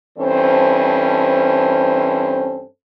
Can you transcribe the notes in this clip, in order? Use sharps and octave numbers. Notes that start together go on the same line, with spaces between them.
G2 E3 C4 C#4 A4 C5